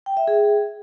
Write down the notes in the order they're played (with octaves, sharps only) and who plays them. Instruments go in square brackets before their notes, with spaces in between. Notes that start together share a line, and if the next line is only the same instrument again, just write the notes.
[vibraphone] G5
E5
G#4